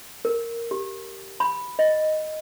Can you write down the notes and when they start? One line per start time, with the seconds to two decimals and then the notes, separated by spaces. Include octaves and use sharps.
0.25 A#4
0.71 G4
1.40 B5
1.79 D#5